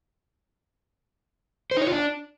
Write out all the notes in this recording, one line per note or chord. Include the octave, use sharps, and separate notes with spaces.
C5
D#4
C#5
F4
D4